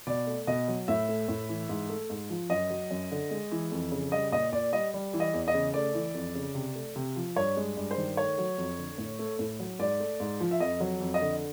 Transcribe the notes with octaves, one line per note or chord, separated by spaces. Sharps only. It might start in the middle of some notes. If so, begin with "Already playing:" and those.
B2 D5
A3
B2 D#5
F#3
A2 E5
A3
A2
E3
G#2
A3
G#2
F3
F#2 D#5
F#3
F#2
D3
G#3
E3
F2
C#3
G3 D#5
A#2 D#5
A#2 D5
G3 D#5
G3
E3
D#5
E2
D#5
C#3
A3 D5
E3
F2
C#3
C3
A3
C3
F3
G2 C#5
G#3
G2
C5
D#3
A3 C#5
F#3
F2
D3
A2
A3
A2
F#3
G#2 D5
A3
G#2
F3
E5
F2 D#5
F#3
F2
D#5
D3